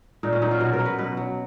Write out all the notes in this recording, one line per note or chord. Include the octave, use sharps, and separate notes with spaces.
A#2 D#4
C#4
F#3 D#4
F4
B2 F#4
A#4
F#3
B4
B2 B4
F#3